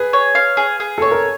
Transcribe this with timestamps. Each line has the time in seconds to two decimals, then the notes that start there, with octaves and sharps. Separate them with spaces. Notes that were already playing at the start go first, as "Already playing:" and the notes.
Already playing: G#4 B4
0.13 C#5
0.35 F5
0.57 G#4
0.80 G#4
0.98 A4 C#5
1.11 A#4